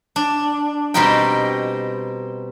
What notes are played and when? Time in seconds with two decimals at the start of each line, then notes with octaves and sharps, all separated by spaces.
0.16 D4
0.94 B2 G3 C4 D#4 A#4 G5